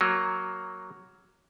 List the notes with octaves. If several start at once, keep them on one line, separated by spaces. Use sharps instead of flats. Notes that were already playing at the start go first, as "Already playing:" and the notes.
F#3 A#3